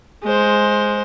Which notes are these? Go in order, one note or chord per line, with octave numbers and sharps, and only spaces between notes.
G#3 C5